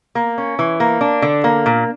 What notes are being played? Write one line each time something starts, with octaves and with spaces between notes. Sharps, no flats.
A#3
C#4
E3
A#3
D4
D3
A#3
A#2